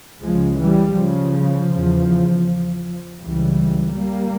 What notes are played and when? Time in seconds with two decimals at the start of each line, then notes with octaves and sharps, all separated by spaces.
0.22 C#2 C#3 F3 G#3
0.59 E3 G3
0.97 C#3 F3
1.71 E2 C#3
3.20 C#2 C#3 E3 G3
3.94 G3 A#3